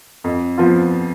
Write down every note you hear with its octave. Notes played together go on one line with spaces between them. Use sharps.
F2
F3 B3 F4